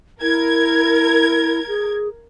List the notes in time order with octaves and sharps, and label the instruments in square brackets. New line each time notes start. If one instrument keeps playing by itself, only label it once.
[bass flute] E4 [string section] A#4 G#6
[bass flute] G#4